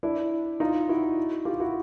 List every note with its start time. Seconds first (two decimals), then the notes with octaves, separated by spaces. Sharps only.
0.03 D4 E4
0.60 D#4 F4
0.89 E4 F#4
1.45 F4 G4
1.60 E4 F#4